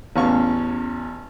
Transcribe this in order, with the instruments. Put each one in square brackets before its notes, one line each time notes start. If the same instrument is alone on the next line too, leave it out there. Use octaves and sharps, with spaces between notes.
[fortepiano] A1 E2 C#4 F5 C#6